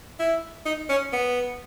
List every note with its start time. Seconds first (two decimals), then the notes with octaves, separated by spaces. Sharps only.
0.19 E4
0.66 D#4
0.89 C#4
1.13 B3